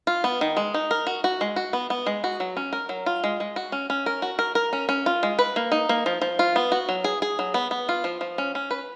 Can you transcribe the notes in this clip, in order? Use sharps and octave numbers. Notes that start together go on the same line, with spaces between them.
F4
B3
D#3
G#3
D#4
A#4
F#4
F#4
G#3
F#4
B3
B3
G#3
F#4
F#3
C#4
A#4
F#3
F4
G#3
G#3
F#4
C#4
C#4
A#4
F#4
A#4
A#4
C#4
C#4
F4
G#3
B4
A#3
D#4
A#3
F3
F3
F4
B3
F#4
F#3
G#4
G#4
F#3
B3
B3
F4
F3
F3
C#4
C#4
B4